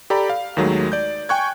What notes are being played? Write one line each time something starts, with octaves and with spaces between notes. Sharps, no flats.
G4 A4 D5 A#5 B5
F5
D#2 D#3 F#3 G#3 A3
D5 G6
G5 G#5 C#6 F#6 G#6